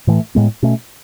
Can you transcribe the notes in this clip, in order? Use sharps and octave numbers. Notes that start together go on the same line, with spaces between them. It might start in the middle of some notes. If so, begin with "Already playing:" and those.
A2 E3 A3
A2 G#3 B3
B2 A3 C#4